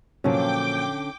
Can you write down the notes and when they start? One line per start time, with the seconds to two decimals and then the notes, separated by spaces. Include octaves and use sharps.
0.24 A#2 D3 F3 F#3 C#4 G5 D6